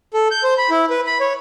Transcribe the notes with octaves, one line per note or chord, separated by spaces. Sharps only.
A4
G6
C5
B5
E4
B4
B5
C#5